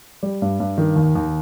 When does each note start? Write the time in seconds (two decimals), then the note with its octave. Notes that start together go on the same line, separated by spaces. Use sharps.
0.23 G3
0.42 G2
0.60 G2
0.78 D#3
0.96 D#2
1.15 D#2